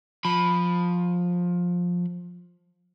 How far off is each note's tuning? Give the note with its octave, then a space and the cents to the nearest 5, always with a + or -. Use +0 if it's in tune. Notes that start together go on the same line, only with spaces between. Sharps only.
F3 +15 B5 +0